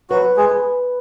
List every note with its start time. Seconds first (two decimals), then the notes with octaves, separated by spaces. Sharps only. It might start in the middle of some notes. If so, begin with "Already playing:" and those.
0.10 F#3 F#4 B4
0.37 G#3 G#4
0.51 B4